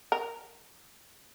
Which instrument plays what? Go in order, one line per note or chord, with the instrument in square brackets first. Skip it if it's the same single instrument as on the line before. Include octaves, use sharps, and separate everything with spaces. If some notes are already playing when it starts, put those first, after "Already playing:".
[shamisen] A#4